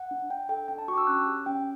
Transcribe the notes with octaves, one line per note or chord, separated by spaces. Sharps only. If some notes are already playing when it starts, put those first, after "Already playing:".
Already playing: F#5
D4
D4 G5
A4 G5
D4 G5
A5
F#4 C#6
D6
E6
C#4 F#6
G4
C#4 G5